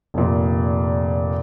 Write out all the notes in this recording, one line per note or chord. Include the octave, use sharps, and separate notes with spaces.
F1 A#2